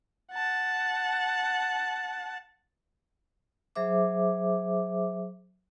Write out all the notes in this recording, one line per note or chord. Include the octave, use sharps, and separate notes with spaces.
F#5 A5
F#3 G#4 C5 E5 D6